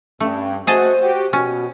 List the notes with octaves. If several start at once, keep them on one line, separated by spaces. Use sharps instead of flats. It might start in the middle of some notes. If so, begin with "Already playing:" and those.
G2 A3 C#4
A3 F#4 G#4 C5 D#5 A5
F#4 G4
B2 C#4 F#4